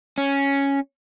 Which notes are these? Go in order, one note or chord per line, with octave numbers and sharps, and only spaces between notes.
C#4